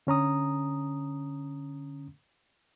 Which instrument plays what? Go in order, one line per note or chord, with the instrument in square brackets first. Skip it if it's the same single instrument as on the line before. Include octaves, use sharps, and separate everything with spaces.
[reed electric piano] D3 C#4 A#5 D#6